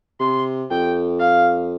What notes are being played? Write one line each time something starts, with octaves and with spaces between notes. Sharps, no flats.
C3 C6
F2 G5
F5